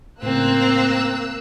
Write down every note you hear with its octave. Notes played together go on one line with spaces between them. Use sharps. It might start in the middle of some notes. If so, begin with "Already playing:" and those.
A2 C#3 A#3 C4 E6 F#6